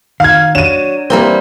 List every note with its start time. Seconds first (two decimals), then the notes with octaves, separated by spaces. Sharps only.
0.20 D#3 F5 G#6
0.55 F#3 D4 D#7 E7
1.10 E3 G3 A#3 C4